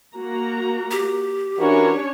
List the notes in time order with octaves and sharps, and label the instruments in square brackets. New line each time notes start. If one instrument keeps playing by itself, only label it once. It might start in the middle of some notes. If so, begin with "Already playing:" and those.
[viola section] A#3 F#4 A#5
[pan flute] G4
[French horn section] E3 F#4 A#4 [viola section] C#4 D4 C#5